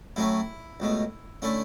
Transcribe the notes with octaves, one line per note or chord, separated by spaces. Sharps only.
A2 F#3 A3 C#4 E4
C#2 B2 A3
D3 A3 C#4 E4